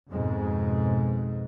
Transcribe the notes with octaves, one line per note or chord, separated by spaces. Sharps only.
F2 G#2 B2 G#3